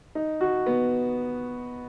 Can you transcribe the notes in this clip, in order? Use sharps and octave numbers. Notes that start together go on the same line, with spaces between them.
D#4
F#4
B3